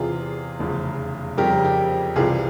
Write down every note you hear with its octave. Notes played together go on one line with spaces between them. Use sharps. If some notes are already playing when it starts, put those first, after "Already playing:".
Already playing: E2 C3 E3 F4 G#4
F1 E2 C#3 F3
F2 C#3 G3 C4 G4 A#4
G4
C2 C3 E3 G3 F4 G#4